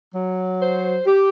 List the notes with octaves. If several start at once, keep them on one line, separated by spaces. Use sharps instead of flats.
F#3
C5
G4